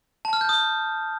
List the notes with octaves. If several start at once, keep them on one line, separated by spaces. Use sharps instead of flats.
A5
F6
G6
D#6